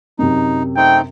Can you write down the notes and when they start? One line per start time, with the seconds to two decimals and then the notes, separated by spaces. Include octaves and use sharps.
0.19 F#2 C3 D#4
0.77 A3 C4 D#4 G5